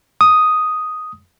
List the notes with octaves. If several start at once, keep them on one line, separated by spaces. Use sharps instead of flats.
D#6